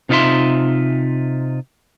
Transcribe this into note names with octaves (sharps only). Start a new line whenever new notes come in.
C3 D#4 F4 C5 E5 C6